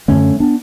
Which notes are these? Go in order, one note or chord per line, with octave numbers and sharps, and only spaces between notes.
F#2 D3 A3 C#4
B3 D4